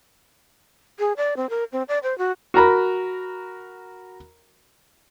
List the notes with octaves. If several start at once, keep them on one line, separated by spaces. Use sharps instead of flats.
G#4
D5
C4
A#4
C4
D5
C5
F#4
F#4 A#4 A#5 B5